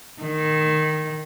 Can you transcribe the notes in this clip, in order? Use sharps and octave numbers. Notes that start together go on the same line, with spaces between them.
D#3